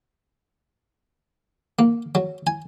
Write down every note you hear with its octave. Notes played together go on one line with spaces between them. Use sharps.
A#3
F#3
G#5